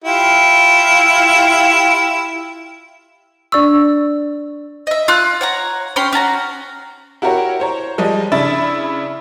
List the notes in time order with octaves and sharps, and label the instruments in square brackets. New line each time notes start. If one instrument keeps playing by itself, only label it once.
[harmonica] E4 F4 G4
[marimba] D4 C#6 [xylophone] D5 E6
[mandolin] D#5 E5
F4 F6 F#6
C#5 F#5 A#5
C#4 G4 C#5 C6
C#4 F#4 A5 A#5
[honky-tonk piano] E4 F#4 G4 A#4 C#5 F#5
C5 C#5 A#5
F3 G3 G#3 D#5
C#3 D4 E4 E5 B5 A6